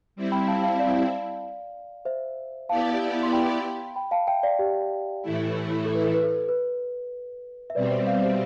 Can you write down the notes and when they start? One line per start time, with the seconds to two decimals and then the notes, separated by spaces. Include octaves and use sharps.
0.16 G3 C4 E4
0.32 G5 B5
0.48 F5 A5
0.63 F5 A5
0.79 D5 F5
2.05 C5 E5
2.69 B3 E4 G4 D5 F5 A5
3.23 C6
3.33 G5 B5
3.96 G5 B5
4.11 F5 A5
4.27 E5 G5
4.43 D5 F5
4.59 G4
5.22 A2 E3 A3 E4
5.85 A4
5.95 B4
6.04 A4
6.14 B4
6.24 A4
6.49 B4
7.70 E5
7.75 B2 G3 C4 B4 D5
7.91 C5 E5
8.07 D5 F5
8.23 C5 E5